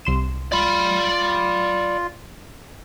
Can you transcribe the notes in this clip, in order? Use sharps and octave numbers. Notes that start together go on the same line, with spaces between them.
C2 C6 E7
F4 D5 B5